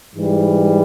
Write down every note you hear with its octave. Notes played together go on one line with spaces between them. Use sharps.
G#2 E3 G3